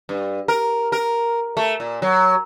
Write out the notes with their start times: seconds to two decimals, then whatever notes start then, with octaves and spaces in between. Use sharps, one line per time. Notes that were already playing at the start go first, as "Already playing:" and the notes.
0.09 G2
0.48 A#4
0.92 A#4
1.57 A3
1.80 A#2
2.02 F#3